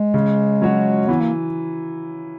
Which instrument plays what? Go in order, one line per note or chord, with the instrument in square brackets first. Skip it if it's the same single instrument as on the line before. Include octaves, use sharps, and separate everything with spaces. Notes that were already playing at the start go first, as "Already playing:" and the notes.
Already playing: [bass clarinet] G#3
[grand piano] C#3
F#3 C#4 F#4 C#5
[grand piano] E3 [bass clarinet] B3
[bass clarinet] A#3